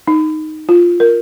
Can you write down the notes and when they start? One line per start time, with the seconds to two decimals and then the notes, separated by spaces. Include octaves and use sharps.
0.07 D#4
0.69 F4
1.00 A#4